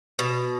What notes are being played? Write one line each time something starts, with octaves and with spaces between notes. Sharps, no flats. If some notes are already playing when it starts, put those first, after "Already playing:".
B2